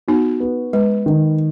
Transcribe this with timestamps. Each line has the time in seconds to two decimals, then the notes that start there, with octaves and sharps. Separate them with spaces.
0.08 B3 D#4 F#4
0.40 B3
0.73 G#3 B4
1.06 D#3